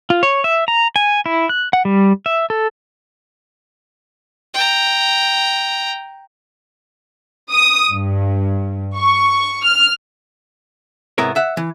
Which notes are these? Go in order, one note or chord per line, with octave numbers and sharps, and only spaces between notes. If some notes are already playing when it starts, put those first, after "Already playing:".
F4
C#5
E5
A#5
G#5
E4
F#6
F#5
G3
E5
A4
G5 A#5
D#6
G2
C#6
F6
G#2 C3 B3 E4 A#4 C#5
E5 F#5
E3